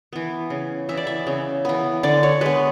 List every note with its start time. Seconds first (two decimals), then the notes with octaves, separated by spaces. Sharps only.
0.13 E3 B3
0.50 C#3
0.89 E3 B3 E5
0.97 D5
1.07 E5
1.27 C#3
1.65 E3 B3
2.03 D3 D5
2.23 C#5
2.41 G#3 B3 B4